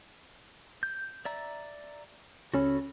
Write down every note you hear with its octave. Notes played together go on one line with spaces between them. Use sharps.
G6
D5 E5 A#5
C#2 C#4 F#4 A4 B5